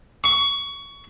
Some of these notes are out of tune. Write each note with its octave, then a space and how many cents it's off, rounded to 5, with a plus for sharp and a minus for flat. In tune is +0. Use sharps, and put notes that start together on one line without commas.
C#6 +20